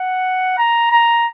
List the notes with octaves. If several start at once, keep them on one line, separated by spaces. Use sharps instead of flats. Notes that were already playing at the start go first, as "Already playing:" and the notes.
Already playing: F#5
A#5
A#5